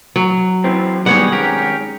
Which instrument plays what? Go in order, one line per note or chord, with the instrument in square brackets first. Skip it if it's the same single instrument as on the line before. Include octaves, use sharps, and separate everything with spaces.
[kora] F#3
[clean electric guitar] E3 C4
[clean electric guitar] G#2 D#3 [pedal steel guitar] G3 B3 [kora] G#4 C#5 F#5
[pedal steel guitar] C#4 G4 A#4